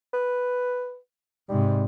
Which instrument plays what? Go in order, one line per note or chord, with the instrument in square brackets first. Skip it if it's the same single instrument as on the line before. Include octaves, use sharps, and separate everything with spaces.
[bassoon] B4
[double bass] G#2 C3 [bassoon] G3